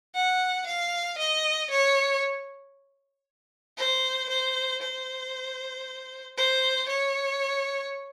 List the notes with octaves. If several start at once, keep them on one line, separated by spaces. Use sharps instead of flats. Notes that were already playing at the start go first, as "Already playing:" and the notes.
F#5
F5
D#5
C#5
C5
C5
C5
C5
C#5